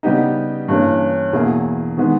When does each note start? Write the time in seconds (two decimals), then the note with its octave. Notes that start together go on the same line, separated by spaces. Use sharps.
0.03 C#3 G3 B3 D#4 G4
0.68 G2 E3 A#3 C#4
1.33 E2 B2 A#3 E4 G#4
1.98 D#3 G#3 B3 D#4